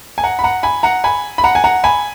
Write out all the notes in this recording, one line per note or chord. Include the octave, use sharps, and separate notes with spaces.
G#5
F#5 A#5
B5
F#5 A#5
G#5 B5
F#5 A#5
G#5 B5
B5
F#5 A#5
G#5
F#5 A#5
G#5 B5